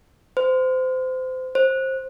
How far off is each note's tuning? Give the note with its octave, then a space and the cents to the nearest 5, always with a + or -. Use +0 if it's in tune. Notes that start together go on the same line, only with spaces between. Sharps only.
C5 -25
C5 +20